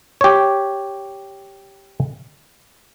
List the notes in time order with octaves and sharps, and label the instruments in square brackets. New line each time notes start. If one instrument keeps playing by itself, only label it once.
[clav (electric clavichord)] G4 C#5